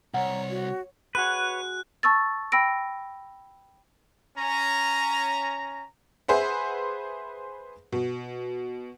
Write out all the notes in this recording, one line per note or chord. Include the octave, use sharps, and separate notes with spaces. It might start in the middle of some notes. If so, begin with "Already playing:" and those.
C2 C#5 F#5 A#5
F#4
G#3 F#4 B4 C#5 F#5 F#6
A5 C#6 E6 A6
G5 B5 E6 A#6 D7
C#4 A#5
G#4 B4 C5 E5 F#5
B2